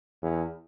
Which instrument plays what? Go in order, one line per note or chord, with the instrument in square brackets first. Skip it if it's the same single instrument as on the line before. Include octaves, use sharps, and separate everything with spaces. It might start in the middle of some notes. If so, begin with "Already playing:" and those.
[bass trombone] E2